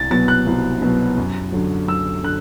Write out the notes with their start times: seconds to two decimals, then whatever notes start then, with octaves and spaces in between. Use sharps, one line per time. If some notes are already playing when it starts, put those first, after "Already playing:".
Already playing: C2 A6
0.11 B2 F#3 B3 A6
0.28 F#6
0.47 C2
0.82 B2 F#3 B3
1.17 F#2
1.52 D3 F#3
1.88 F#2 E6
2.23 D3 F#6